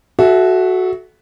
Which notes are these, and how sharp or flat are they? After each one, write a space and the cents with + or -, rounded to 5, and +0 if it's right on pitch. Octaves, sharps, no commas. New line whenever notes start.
F#4 +0 A4 -35 E5 +0